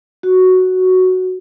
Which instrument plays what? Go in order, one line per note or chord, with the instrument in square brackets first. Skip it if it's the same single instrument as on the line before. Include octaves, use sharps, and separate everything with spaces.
[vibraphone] F#4